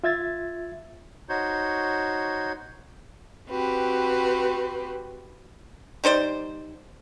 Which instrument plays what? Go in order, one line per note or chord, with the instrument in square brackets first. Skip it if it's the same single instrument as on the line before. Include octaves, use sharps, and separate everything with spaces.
[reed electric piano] F4 E5 G#6 A6
[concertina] D#4 F#4 C5 C#5
[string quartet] C4 F#4 G4 B4
[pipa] G3 D#4 C5 D5